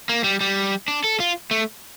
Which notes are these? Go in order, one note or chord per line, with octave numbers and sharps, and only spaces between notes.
A#3
G3
G3
D4
A4
F4
A3